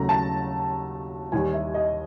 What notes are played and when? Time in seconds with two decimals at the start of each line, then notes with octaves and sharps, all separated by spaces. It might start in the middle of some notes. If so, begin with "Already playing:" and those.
Already playing: D#2 C#3 F#3 A3 A#5
0.09 A5
1.32 D#2 D#3 G3 G#5
1.53 E5
1.74 D#5